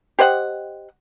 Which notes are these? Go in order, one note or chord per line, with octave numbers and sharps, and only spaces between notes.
G4 C5 D#5 F#5